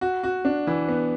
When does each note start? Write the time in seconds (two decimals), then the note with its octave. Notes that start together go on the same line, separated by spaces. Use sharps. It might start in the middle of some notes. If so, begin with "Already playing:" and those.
0.01 F#4
0.23 F#4
0.45 D4
0.67 E3
0.88 B3